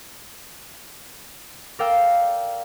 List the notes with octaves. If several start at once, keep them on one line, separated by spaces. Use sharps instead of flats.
A#4 D5 F5 G5 E6